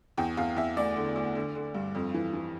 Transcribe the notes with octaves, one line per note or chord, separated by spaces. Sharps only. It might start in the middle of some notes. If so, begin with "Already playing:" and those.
E2 G5
E2 F5
E2 E5
D2 D5
D3
D2
D3
D3
G2
F2
E3
E3